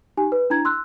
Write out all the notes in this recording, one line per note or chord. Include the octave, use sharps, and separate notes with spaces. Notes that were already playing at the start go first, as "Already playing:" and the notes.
D#4 G4 G#5
B4
D4 E4 A#5 G#6
C6 E6 F#6